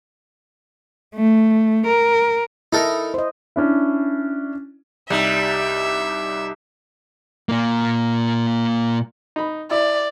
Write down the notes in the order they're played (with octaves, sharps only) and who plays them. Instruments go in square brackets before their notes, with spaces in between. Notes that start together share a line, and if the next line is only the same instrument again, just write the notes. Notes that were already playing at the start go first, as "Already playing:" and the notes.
[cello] A3
A#4
[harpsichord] D#4 A4 A#4 [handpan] E4
[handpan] C5 D#5
[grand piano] C#4 D4 E4
[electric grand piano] C2 D#4 [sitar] G3 [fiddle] E5
[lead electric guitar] A#2 A#3
[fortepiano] D#4 B5
[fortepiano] E4 [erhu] D5